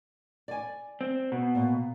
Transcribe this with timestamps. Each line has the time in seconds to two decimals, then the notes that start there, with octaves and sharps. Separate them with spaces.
0.48 D5 G#5
1.01 C4
1.32 B2
1.55 A#2